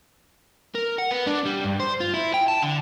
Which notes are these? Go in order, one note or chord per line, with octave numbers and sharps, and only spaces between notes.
A#4
F#5
B3
D4
G3
G2
C5
F4
E4
G5
A5
D3